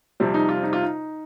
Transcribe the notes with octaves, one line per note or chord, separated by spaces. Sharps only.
F2 C3 G3 C4
D#4
F4
D#4
F4
D#4